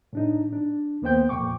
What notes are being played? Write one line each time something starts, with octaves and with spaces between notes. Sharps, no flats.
A2 D4 D#4
D4
D#2 A#3 B3 C5 G5 G6
F2 A#2 G5 C#6 D6